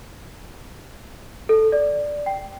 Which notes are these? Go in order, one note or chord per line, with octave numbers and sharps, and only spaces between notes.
A4
D5
G5